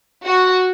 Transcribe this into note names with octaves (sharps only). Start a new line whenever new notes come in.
F#4